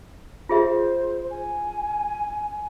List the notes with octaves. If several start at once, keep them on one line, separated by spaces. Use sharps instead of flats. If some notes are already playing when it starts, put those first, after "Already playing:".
F4 G#4 C5 E5
G#5